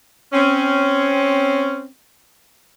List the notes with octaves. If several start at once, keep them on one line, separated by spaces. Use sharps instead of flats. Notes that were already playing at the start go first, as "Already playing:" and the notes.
C4 C#4